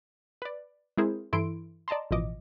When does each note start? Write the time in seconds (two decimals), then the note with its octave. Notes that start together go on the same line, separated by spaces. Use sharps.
0.42 B4 D5
0.98 G#3 C4 E4 G#4 A#4 C5
1.33 G2 E3 E4 A4 C6 D7
1.88 D5 D#5 A5 A#5 C6
2.11 A1 B2 E3 F3 D#5 D6